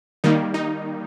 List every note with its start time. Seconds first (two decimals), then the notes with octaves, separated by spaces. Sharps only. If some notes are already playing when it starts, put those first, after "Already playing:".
0.24 D#3 G3 A#3 D#4
0.54 D#4